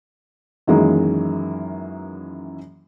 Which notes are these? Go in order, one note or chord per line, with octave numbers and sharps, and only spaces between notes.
F#2 D#3 E3 F#3 G#3 A#3